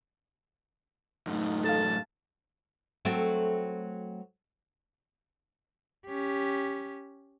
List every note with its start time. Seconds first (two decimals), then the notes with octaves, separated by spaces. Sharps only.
1.27 F#2 A2 D#4
1.64 A4 F5 A5
3.05 F#3 A3 C4
6.06 C#4 G4